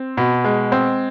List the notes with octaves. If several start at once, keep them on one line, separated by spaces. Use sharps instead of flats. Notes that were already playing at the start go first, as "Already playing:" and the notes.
Already playing: C4
B2
G#3
C4